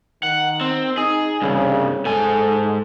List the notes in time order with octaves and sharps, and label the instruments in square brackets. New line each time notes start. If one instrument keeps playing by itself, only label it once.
[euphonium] D#3 [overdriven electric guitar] F#5
[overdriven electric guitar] C4
[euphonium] D#4 [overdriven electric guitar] G#4
[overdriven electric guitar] C2 G2 [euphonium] C#3
[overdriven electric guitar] G#2 G#5 [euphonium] A4